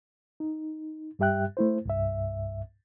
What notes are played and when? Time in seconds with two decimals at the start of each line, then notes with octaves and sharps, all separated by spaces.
0.40 D#4
1.19 G2 G3 G4 E5 G5 F#6
1.57 A3 E4 C5
1.85 C2 G2 E5